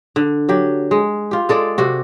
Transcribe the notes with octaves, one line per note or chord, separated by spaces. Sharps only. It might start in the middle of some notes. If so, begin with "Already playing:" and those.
D3
F#3 G4
G#3
F4 G4
G#3 A4 D5
C3 F#4